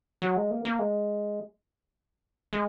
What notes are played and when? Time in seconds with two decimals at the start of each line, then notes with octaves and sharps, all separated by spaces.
0.22 F#3
0.36 G#3
0.51 A#3
0.65 A#3
0.79 G#3
2.53 G#3